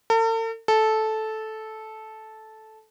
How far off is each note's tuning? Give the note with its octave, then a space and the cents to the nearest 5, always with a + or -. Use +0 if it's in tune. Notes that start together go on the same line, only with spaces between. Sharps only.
A4 +45
A4 -10